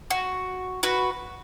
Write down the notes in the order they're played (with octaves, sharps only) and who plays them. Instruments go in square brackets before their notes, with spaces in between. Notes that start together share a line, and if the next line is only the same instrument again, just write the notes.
[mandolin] F#4
F#4 B4